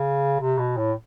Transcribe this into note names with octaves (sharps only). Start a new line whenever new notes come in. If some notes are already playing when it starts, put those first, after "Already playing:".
Already playing: C#3
C3
B2
A2